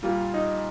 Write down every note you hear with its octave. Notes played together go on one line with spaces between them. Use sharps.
A#2 G3 F4
D#4